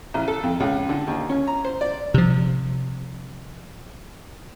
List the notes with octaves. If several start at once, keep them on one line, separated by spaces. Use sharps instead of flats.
A1
A4
F2
C#2
D3
D#2
C#4
A#5
C5
D5
C3 F3